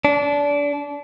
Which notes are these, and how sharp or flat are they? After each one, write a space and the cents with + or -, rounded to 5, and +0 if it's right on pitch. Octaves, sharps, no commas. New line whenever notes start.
D4 -25